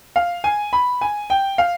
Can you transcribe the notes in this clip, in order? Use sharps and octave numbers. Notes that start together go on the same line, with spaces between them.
F5
G#5
B5
G#5
G5
F5